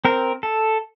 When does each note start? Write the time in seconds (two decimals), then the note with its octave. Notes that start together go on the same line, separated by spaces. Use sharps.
0.05 C4 A#4
0.43 A4